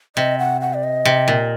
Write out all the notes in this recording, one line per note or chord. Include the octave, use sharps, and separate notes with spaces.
C3 D#5
F#5
F#5
D5
D#5
C3
A#2